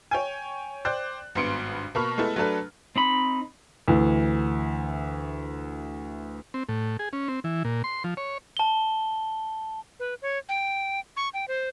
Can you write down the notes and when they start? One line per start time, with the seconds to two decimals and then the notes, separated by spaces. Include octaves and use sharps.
0.11 C#5 G5 G#5
0.85 C5 D5 G5 F#6
1.35 G#1 G2 B3 C6 C#7 D7
1.95 B2 A#3 A5 B5 C#6 F6
2.18 G#3 A3 B3 E4 A4
2.36 F#3 A3 D4 A4 B4
2.96 C4 D#4 B5
3.88 D2 E3
6.54 C4
6.69 A2
6.99 G#4
7.13 C#4
7.28 C4
7.44 E3
7.65 A#2
7.84 C6
8.04 F3
8.17 C#5
8.57 A5 G7
10.00 B4
10.22 C#5
10.49 G5
11.17 C#6
11.34 G5
11.48 C5